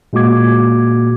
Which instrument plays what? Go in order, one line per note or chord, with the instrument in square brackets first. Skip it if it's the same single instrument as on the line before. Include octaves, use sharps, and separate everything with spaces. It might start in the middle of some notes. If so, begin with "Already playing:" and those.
[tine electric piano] A#2 G#3 A#3 F#4 D6 G#6